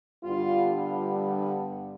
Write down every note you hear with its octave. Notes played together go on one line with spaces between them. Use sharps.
G2 D3 G3 B3 F4